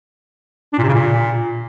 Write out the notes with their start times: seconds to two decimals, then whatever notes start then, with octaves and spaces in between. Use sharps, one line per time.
0.73 D4
0.78 A#2
0.83 C3
0.88 C#3
0.93 A#2